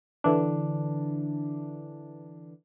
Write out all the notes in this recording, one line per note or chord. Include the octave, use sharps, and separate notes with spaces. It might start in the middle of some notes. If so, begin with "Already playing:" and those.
D3 E3 D4